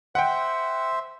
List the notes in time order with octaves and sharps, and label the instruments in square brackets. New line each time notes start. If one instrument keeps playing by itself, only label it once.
[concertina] C5 E5 [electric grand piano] F#5 G5